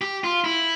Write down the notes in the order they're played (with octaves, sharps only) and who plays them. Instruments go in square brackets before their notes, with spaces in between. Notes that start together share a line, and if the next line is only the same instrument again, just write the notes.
[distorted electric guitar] G4
F4
E4